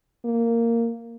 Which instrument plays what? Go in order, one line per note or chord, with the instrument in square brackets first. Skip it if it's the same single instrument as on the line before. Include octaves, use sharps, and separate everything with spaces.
[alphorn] A#3